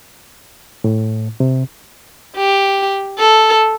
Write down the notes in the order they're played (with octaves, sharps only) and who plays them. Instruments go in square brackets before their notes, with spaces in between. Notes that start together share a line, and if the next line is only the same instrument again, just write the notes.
[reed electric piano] A2
C3
[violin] G4
A4